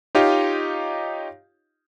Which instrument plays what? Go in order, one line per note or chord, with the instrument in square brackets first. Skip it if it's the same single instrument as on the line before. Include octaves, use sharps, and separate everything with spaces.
[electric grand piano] D#4 F4 G4 C#5 D#5 F5